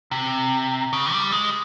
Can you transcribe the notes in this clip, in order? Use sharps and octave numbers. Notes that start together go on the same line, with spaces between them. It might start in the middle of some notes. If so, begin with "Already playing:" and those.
C3
C#3
G3
G#3